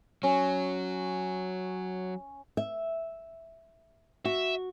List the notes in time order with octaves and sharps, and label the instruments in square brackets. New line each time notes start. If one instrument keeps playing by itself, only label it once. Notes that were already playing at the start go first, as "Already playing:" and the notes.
[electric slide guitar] F#3 [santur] C#4
[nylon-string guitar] E5
[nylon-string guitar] F#4 [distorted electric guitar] E5